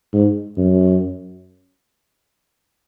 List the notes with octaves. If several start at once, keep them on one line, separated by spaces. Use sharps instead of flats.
G#2
F#2